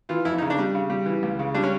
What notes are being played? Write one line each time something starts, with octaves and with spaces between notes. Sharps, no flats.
E3 F4
F2 E4
D#4
C#3
D4
G3
C#3
G3
E3
C#2
C#3
G3 D4
C#4